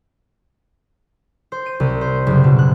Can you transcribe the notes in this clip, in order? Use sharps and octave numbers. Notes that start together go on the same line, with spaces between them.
C5
D#7
C2
C5
F#1
B2
F#6